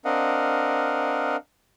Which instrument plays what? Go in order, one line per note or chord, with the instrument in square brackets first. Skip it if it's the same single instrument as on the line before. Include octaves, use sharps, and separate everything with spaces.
[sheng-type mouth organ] C4 D4 A#4 D#5 F5 F#5